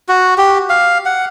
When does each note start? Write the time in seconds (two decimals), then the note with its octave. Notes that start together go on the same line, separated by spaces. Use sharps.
0.08 F#4
0.38 G4
0.70 F5
1.05 F#5